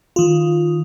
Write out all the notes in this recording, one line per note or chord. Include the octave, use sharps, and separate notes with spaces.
D#3 F4